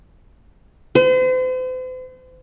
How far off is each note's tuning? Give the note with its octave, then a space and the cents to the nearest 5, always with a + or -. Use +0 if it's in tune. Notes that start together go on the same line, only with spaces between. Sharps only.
C5 -40